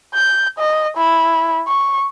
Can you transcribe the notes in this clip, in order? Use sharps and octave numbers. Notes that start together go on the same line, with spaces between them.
G6
D#5
E4
C#6